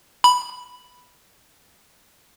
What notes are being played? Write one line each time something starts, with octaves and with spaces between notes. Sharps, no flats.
B5